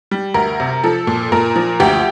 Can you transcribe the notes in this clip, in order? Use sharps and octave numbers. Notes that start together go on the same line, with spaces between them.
G3
D2 A#4
C3
F3 A4
A#2
A#2 A#4
F3
D2 G4